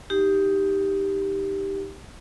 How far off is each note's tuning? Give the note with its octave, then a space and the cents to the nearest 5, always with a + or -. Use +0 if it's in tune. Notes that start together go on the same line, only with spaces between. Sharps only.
D#4 +10 G4 +0